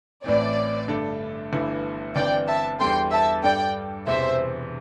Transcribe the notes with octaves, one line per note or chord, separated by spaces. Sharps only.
A1 A2 E3 C4 D5
G2 D3 A3 D4 A4
G1 G2 E3 A3 E4
G1 G2 E3 C4 D5 G5
E5 A5
E2 E3 G3 D4 A4 G5 C6
E5 A5
G2 G3 D4 A4 D5 G5
E1 E2 C3 E3 C5 E5